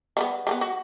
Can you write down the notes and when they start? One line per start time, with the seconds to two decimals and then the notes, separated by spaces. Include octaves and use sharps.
0.17 G3 A3 B3
0.47 G3 A#3 B3
0.61 F#4